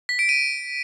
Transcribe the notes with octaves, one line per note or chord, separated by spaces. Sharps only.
B6
D7
D#7